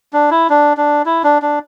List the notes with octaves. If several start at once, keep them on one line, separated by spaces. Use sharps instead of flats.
D4
E4
D4
D4
E4
D4
D4